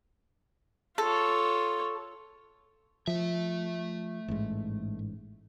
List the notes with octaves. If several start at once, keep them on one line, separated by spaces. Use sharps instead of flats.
F4 A4 C#5
F3 A3 E5
A1 G#2